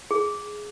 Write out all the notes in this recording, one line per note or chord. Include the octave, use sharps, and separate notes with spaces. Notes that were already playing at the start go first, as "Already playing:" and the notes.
G#4